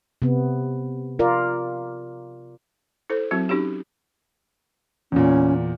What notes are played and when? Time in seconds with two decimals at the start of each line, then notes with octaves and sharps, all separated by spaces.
0.22 C3 B3
1.19 F4 A#4 D5
3.10 E4 A4 C5
3.31 F#3 C4 E4 F#4
3.49 C#4 D#4 F#4 G4
5.12 E2 A#2 C#4